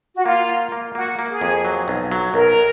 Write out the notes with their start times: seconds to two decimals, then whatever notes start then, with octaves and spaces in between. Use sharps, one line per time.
0.15 F#4
0.26 A#3 F4
0.49 F4
0.72 A#3
0.95 A#3 F#4
1.19 A#3
1.30 G#4
1.41 F2
1.65 F#3
1.88 B1
2.12 F#3
2.34 B1 A#4